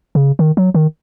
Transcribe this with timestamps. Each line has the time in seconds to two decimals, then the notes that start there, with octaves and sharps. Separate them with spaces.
0.15 C#3
0.39 D#3
0.57 F#3
0.74 D#3